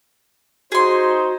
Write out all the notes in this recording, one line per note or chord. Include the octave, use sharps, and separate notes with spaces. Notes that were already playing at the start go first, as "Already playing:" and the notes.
D#4 F#4 G#4 C5 C6